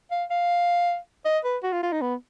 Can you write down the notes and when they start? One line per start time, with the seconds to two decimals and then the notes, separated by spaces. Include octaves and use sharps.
0.11 F5
0.30 F5
1.25 D#5
1.44 B4
1.63 F#4
1.72 F4
1.83 F4
1.92 D#4
2.01 B3